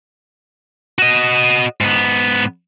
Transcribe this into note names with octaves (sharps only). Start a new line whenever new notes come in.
F#4 D#5
G#2 B3